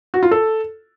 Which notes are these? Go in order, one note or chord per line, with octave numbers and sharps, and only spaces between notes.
F#4
F4
A4